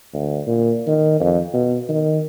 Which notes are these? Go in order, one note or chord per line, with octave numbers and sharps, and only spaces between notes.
D2
A#2
D#3
F2
B2
D#3